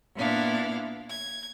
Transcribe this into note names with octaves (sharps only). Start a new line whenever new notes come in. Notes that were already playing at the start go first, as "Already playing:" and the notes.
A#2 B3 D4 E4 F5
G#6